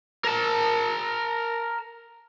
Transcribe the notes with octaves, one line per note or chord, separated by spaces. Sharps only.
A#4 A5